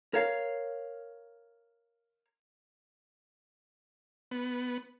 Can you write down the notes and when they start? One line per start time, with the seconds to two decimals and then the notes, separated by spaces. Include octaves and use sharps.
0.14 A#4 C#5 F5
4.31 B3